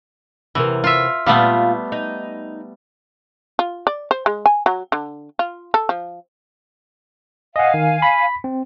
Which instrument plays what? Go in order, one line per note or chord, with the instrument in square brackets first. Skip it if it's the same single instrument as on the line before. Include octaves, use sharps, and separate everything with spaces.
[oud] E2 C3 A#4 [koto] E3
[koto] F4 E5
[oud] A#2 F4 F5 [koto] G3 A3 B3
[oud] D#4
[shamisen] F4
D5
C5
G#3
G#5
F#3
D3
F4
A4
F3
[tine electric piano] D#5 F#5 [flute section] F5 G#5
[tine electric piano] D#3
B5 B6
C4